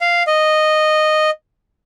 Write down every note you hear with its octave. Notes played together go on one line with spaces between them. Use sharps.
F5
D#5